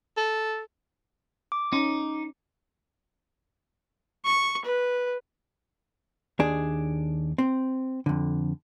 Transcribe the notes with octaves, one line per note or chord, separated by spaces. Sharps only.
A4
D6
C#4 D#4 C6
C#6
B4
D#2 D4 G#4
C4
F2 D3